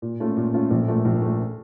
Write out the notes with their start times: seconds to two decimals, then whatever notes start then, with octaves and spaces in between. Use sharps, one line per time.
0.02 A#2
0.20 A3 C#4 F4
0.37 A#2
0.54 A3 C#4 F4
0.71 A#1
0.88 A#2 A3
1.05 A#1
1.22 A#2 A3